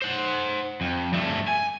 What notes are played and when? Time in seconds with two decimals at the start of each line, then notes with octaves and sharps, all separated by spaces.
0.02 C5 F#5
0.81 F2
1.13 G2 A3
1.48 G#5